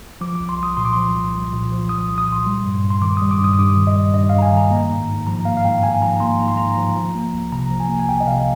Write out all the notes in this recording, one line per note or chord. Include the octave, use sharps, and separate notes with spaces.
F3 D6
D6
C2
C6
C2 D#6
A#2 C6
D6
F3 C6
C2
C2
A#2
F3
C2 D#6
C2
D#6
A#2 C6
G3
G2
G2
C6
D#3 D6
G3 D#6
D6
G2 D#6
D#6
G2 D6
D#3
D#5
G3
G2 D#5
G2 F5
A#5
G#5
D#3 A#5
A#3
G#2
G#2
F3 A#5
A#3 F5
F5
G#2 G5
G#2 G#5
F3 A#5
A#3 C6
G#2 A#5
C6
G#2 A#5
F3
F3
A#3
C2
C3 A#5
F3
G#5
A#3
G#5
C2 G5
D#5
C3 F5